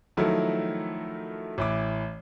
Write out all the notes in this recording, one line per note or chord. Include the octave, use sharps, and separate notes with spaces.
D#3 F3 F#3 A3 E4 A#4
A1 E3 D6